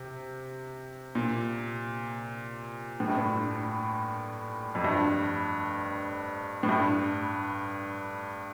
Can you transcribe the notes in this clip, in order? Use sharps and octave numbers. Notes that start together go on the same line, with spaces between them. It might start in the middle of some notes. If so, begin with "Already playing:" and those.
Already playing: C3
A#2
A2
G2
A2
F2
G2
A2
G2